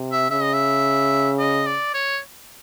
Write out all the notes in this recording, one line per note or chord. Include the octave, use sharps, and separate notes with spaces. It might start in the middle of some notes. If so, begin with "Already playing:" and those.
Already playing: C3
E5
C#3 E5
D#5
E5
D#5
D5
C#5